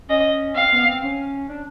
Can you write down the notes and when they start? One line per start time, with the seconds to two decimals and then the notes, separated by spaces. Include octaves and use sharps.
0.09 C#4 D#5
0.55 C4 F5
0.72 B3
0.87 C4
1.03 C#4
1.49 D4